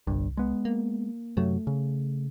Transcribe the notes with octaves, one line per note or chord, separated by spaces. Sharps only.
G1 C2 G2
G#3 B3
A#3
F#2 C3 F#3 A3
C#3